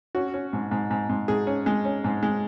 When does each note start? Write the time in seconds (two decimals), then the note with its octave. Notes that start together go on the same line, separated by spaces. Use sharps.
0.15 C#4 F#4
0.34 C#4
0.53 G#2
0.71 G#2
0.91 G#2
1.09 G#2
1.28 G#2 G#4
1.47 C#4
1.66 G#3
1.85 C#4
2.04 G#2
2.23 G#3